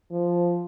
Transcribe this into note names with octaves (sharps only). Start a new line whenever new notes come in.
F3